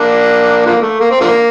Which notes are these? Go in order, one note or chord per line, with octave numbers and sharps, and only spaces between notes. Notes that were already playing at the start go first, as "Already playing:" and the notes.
Already playing: A#3 D4
D3 F3 A#3
A3
A#3
C4
D3 F3 A#3